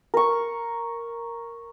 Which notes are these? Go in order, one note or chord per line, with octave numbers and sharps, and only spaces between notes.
A#4 C#6